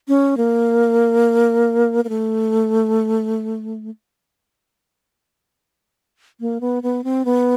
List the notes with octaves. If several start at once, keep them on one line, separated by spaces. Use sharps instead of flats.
C#4
A#3
A#3
A3
A#3
B3
B3
C4
B3